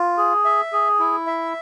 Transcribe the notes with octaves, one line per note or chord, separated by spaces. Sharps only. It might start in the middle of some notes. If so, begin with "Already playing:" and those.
Already playing: F4
G#4
E5
G#4
E4
E5